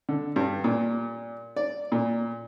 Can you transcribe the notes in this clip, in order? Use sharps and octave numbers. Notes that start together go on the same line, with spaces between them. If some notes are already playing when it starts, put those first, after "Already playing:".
D3
G2
A#2
D5
A#2